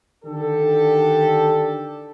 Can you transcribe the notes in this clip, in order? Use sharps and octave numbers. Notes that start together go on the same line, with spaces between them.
D3 D#3 D4 G4 A4